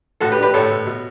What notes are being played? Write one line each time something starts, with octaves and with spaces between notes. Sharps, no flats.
A2 F#4 A4
G4 B4
D4
G4 B4
A2 A4 C#5
A2
B2